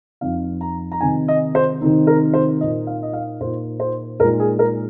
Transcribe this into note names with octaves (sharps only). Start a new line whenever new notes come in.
F2 F3 C4 D#4 F5
A#5
A#5
C3 D#3 C4 D#4 G#5
D#5
C5
C3 D#3 C4 D#4
A#4
C5
A#2 A#3 D#4 D#5
F5
D#5
F5
A#2 A#3 D#4 C5
C5
A#2 G#3 D#4 A#4
G#4
A#4